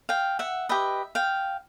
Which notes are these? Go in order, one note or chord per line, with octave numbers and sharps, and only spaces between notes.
F5 G5
E5 F#5
G4 B4 D#5 E5
F5 G5